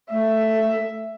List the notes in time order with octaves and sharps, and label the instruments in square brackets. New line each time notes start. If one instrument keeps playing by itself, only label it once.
[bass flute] A3 [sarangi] E5